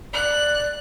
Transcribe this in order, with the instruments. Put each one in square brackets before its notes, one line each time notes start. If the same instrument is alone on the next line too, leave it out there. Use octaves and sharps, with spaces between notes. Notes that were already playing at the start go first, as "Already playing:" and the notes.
[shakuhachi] D5 [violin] F#6